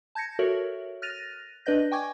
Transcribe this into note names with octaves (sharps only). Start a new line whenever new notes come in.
A5 G6 G#6 A#6 C#7
F#4 A4 A#4 C#5 E5 F#7
F6 F#6 A6 A#6 D#7 F7
D4 B4 D5 D#5 G6 A#6
G5 G#5 C#6 D6 G#6